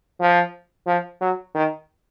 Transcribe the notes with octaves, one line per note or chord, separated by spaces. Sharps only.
F3
F3
F#3
D#3